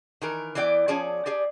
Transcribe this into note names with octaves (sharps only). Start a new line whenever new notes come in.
D#3 E3 A#4
E3 B3 E4 D5 G5
F3 C#4 G#4 D5
G4 G#4 D5